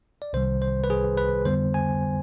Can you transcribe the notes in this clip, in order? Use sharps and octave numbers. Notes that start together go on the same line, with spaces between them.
D5
C2 C3 D#3 G3 C5
C5
B4
G#4
B4
F2 D3 G3 B3 C5
G#5